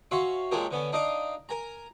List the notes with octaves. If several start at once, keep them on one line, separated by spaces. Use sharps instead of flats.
C#4 F#4 E5 F5 C6 C#6
A#2 G#3 C#4 G4 A4 A#4
D3 B3 C#4
D4 D#4 D#5 F5 D6
A#4 G#5 A#5